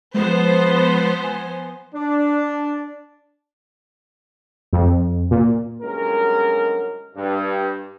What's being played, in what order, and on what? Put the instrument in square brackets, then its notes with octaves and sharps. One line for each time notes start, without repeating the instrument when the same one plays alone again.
[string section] F3 B3 C5 [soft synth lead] G#3
[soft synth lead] G#5
[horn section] D4
[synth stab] F2
A#2
[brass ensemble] G1 F#2 G#3 C#4 A#4
G2